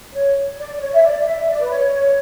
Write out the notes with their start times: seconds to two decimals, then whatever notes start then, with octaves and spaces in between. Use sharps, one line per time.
0.13 C#5
0.57 D5
0.75 D5
0.80 C#5
0.94 E5
1.03 D5
1.25 E5
1.48 D5
1.60 B4
1.70 C#5